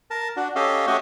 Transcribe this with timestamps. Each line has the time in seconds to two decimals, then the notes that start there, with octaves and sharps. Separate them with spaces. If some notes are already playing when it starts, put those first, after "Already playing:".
0.11 A#4 A5
0.36 D4 F#4
0.56 C#4 G4 A4 D#5 F5
0.87 A3 C#4 F#4 G4 D#5 C#6